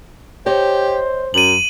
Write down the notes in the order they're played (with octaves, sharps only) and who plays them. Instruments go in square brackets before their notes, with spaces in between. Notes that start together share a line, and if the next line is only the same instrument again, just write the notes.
[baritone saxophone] G4 [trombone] C5 [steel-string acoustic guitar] C#5 D#5 A5
[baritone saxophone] F#2 [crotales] D#7 F#7